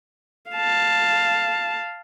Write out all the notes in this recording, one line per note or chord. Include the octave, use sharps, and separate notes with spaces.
F5 A5